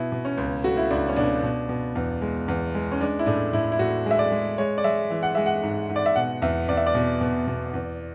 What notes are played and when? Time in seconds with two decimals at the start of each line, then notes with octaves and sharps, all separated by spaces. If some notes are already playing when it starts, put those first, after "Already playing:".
Already playing: B2 E4
0.12 B2
0.25 C#4
0.37 C#2
0.64 A3 F#4
0.77 E4
0.90 C#2 D4
1.08 C#4
1.17 B2 D4
1.43 B2
1.69 B2
1.95 E2
2.22 G#3
2.48 E2
2.75 G#3
2.92 C#4
3.01 G#3 D4
3.19 E4
3.26 A2 D4
3.53 A2 E4
3.72 E4
3.79 A2 F#4
4.06 G#3 E5
4.19 D5
4.32 G#3
4.58 G#3 C#5
4.78 D5
4.84 G#3 E5
5.10 E3
5.23 F#5
5.35 G#3 E5
5.46 F#5
5.63 G#2
5.90 G#2
5.96 D5
6.06 E5
6.16 B2 F#5
6.42 E2 E5
6.68 E2 D5
6.77 E5
6.87 D5
6.95 B2
7.21 B2
7.47 B2
7.74 E2